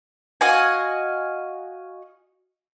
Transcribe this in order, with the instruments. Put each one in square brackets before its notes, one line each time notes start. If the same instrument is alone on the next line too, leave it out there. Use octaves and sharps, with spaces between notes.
[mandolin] F#4 D#5 F5 G#5